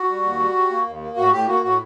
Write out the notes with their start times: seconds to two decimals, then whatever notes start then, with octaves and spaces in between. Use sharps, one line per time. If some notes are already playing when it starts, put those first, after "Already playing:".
Already playing: F#4
0.09 G3
0.23 D#2
0.39 G3
0.55 G3
0.70 A#3
0.86 D#2
1.01 A#3
1.17 A2 F#4
1.32 A2 G4
1.47 A#3 F#4
1.63 A2 F#4